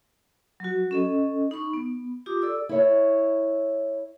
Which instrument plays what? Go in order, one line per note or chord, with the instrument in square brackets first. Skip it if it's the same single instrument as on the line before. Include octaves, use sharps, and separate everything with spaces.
[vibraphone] F#3 F#4
C#4 A4 D#5
D#4 B5 C#6
B3
F4 G4 D6 D#6
A4 D5 E6
[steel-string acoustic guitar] E4 C#5